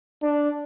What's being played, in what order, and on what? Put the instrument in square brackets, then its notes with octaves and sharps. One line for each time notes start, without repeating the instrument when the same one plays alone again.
[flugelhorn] D4